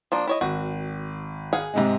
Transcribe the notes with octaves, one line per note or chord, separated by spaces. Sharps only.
F3 A#3 D4
E4 C#5 D#5
G#1 F#4
G#4 F5 F#5
G#2 C3 G#3